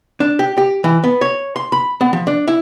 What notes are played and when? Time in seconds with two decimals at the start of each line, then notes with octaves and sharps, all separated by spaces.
0.20 D4
0.39 G4
0.58 G4
0.84 E3
1.04 B3
1.21 C#5
1.56 C6
1.72 B5
2.01 B3
2.13 F3
2.27 D4
2.48 E4